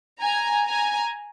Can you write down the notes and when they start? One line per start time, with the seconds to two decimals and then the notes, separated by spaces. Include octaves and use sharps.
0.20 G#5 A#5
0.66 G#5 A#5